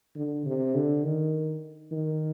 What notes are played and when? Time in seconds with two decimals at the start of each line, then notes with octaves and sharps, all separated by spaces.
0.16 D3
0.46 C3
0.75 D3
1.04 D#3
1.92 D#3